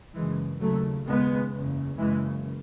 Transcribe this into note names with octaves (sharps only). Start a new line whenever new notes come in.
F#1 F#2 C#3 E3 G#3
D#2 C#3 F#3 A3
D#2 C#3 G#3 B3
F#1 E2 C#3
F#1 F#2 C#3 E3 G#3